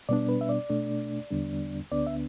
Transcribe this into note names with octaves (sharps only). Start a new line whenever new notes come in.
B2 G3 B3 D4 D5
B4
E5
D5
B2 A3 D4
E2 D3 G3 B3 D4
D2 D3 B3 D4 D5
E5